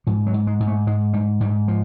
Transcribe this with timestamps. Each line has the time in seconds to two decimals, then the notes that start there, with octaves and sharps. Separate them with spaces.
0.07 G#2 F3
0.27 F#3
0.34 G#2
0.47 G#3
0.60 G#2
0.67 A3
0.87 G#2 G#3
1.13 G#2 G3
1.40 G#2 G3
1.68 F3